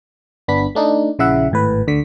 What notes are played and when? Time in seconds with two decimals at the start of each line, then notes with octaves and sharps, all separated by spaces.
0.48 G1 B3 D4 B5 B6
0.75 A3 D4 D#4
1.19 A#1 C#3 E4 E5 F#5
1.51 G#1 A2 B4
1.87 D2 D3 B6